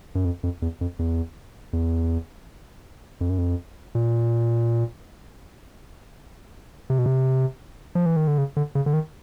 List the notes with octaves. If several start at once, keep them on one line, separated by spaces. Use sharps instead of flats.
F#2
F2
F2
E2
F2
E2
E2
F2
F#2
F2
A#2
C3
B2
C3
F3
E3
D#3
D3
C#3
D3
C#3
D3
D#3